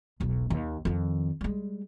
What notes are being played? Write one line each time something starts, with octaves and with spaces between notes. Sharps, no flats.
E1 B1
D#2
F2 D#3
G3 G#3